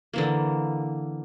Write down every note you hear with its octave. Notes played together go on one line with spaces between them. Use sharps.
D3 E3 A#3